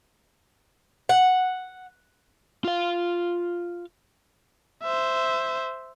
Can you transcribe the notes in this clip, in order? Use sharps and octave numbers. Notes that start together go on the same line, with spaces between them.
F#5
F4 F5
C5 E5